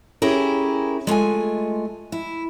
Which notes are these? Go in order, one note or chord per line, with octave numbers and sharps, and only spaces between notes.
C#4 E4 G4 G#4 A#4
G#3 A3 F4 G#5
E4